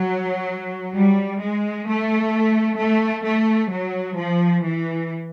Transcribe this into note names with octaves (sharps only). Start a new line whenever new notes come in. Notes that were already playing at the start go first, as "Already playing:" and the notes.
Already playing: F#3
G3
G#3
A3
A3
A3
F#3
F3
E3